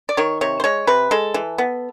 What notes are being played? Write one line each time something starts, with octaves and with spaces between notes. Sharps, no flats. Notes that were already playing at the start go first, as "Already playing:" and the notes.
D5
D#3 C#5
C3 C#5
C5
G#3 C#5
C3 B4
G#3 A4
E3
B3